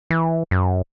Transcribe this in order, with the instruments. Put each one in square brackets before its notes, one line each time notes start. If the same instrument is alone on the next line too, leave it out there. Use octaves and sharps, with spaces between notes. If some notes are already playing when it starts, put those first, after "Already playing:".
[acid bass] E3
F#2